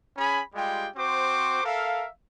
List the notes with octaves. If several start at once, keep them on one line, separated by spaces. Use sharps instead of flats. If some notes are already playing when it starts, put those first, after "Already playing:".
C#4 G#4 G#5 B5
G3 G#3 F4 G4 G5
C4 F#4 C5 C#6 D6
A4 A#4 E5 F5